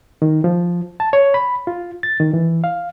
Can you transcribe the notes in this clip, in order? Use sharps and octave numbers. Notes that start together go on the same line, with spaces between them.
D#3
F3
A5
C#5
B5
F4
A6
D#3
E3
F5